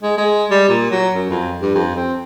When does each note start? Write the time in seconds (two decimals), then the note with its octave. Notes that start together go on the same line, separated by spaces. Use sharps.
0.03 G#3
0.18 G#3
0.50 G3
0.69 A#2
0.91 F#3
1.14 F#2
1.30 F2
1.61 G2
1.75 F2
1.96 C4